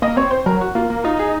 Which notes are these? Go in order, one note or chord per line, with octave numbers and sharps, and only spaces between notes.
A#3 D#5
C4 C#5
C5
F#3 A#4
F#4
A#3 F4
A#3
D#4 F4
G#4